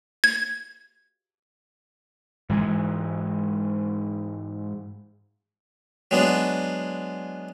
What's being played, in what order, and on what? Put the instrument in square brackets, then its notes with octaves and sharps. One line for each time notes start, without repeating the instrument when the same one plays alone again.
[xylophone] G#6
[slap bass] G#2 E3 G#3
[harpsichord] F#3 G#3 B3 D4